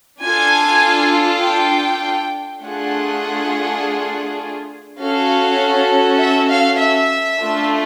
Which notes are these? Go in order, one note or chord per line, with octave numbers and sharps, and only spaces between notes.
D4 F4 A4 G#5
G5
A3 D4 F4 G#4 F#5
C#4 F#4 A4 F5
E5
F5
E5
A3 D4 F4